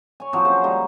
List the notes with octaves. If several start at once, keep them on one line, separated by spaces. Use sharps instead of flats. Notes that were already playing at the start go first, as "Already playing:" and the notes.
C#5 G#5
F3 F#3 C4
C#3 A#3 C5 G#5
D#3 G3 G#3 D#4